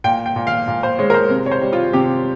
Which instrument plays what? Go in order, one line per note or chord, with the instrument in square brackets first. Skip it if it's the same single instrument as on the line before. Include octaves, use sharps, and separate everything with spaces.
[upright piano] A#2 G5
G5
A#2
F5
A#2
C5
G#3 C#5
A#4
C5
C3
C#5
C5
G3
F4
C3 G4